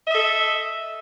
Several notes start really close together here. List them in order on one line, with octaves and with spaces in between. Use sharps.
E5 D#5 A4